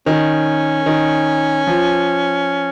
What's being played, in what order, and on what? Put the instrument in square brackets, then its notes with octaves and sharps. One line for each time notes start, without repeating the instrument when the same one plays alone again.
[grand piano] D#3 [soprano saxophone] C#4
[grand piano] D#3
F3